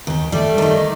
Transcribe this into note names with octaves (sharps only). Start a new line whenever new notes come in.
D#2 G4
G3 A3 D5
D#3 D#4